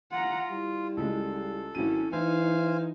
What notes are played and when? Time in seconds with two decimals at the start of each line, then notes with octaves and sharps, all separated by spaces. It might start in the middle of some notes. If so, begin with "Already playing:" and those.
0.11 F4 F#5 A#5
0.50 G3 E4
0.97 C#2 C#3 G#3 A4
1.75 G#1 F#3 C#4 E4 D#7
2.12 E3 D#4 E4 C5 F5 G#5